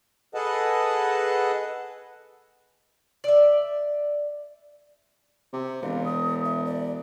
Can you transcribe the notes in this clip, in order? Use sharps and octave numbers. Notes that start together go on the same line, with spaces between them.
G#4 A4 B4 D#5 F#5 A5
D5 E5
C3
E1 F5
D#6
E5
D5